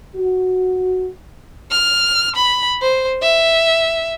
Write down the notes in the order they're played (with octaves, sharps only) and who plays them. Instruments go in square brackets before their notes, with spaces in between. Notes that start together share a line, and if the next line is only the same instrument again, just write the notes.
[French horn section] F#4
[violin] F6
B5
C5
E5